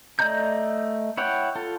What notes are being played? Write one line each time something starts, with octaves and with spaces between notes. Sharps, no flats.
A3 D5 D#5 A#5 G6
E4 C#5 F#5 G5
F4 A4